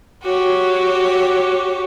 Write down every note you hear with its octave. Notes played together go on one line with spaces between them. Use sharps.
F#4 G4 C#5